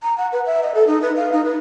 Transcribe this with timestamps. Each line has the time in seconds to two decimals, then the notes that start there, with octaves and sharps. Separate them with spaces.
0.03 A#5
0.18 F#5
0.32 B4
0.46 E5
0.63 D#5
0.75 A4
0.87 D#4
1.02 B4
1.16 F5
1.32 D#4
1.45 B4